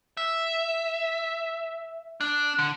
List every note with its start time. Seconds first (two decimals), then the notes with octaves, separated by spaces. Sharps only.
0.17 E5
2.21 D4
2.59 D3